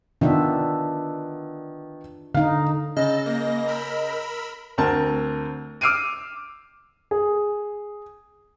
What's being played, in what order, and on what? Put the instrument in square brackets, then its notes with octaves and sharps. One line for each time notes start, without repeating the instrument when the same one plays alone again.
[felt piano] D#3 B3 [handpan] D4 F4 E5
[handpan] D3 D#4 [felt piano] F5
[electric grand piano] C#3 [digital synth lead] D#5 [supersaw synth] E6 A6
[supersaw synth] A#3 A#6
A#4 B5 E6
[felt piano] D2 C4 A#4 A5
D6 E6 F6 C7 D7 D#7
[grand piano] G#4